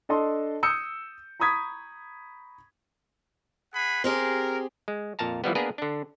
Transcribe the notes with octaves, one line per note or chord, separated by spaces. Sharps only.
D4 A4 D#5 A5 C6
D#6 E6 G6 C#7
A#5 B5 C#6 D#6 G#6 B6
G#4 F#5 B5
C4 G4 G#4 A#4
G#3
F2 A#2 F5 A5 A#5
E3 F3 G3 B3
A#3 B3 D4 G#4 A#4 B4
D3 D4